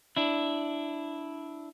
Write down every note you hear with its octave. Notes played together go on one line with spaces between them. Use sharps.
D4 E4